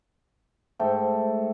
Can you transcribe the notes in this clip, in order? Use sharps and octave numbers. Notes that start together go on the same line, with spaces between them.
G#2 A3 A4 G5